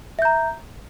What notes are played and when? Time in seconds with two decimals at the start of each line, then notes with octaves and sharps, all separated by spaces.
0.19 E5
0.22 G6
0.25 A#5